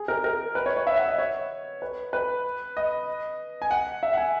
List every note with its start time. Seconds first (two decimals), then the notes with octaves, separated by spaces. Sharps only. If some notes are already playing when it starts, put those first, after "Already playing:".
Already playing: G#4
0.08 A#4
0.24 A#4
0.55 B4
0.66 C#5
0.77 C#5
0.87 E5
0.98 F#5
1.08 D#5
1.18 C#5
1.82 B4
2.13 B4
2.77 D#5
3.62 G#5
3.71 F#5
4.03 E5
4.13 F#5
4.17 G#5